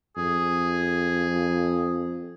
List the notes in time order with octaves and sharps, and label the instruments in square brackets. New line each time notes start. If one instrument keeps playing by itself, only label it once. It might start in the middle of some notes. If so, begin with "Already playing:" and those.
[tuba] F2 [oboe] G#4